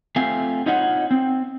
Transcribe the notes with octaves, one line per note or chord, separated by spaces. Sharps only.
A3 C4 F4 F5 G#5
D#4 F4 C#5 D#5 F#5
C4